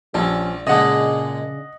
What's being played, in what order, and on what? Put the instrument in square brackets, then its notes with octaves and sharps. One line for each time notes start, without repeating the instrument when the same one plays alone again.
[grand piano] A#1 [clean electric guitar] F3 C#4 [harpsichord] G3
[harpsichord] A#2 G#3 [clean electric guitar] C#3 D4 [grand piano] D#5 F#5